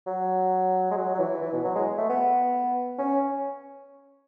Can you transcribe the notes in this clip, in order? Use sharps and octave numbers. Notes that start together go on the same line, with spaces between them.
F#3
G#3
F#3
F#3
E3
E3
B2
F#3
G#3
A3
B3
C#4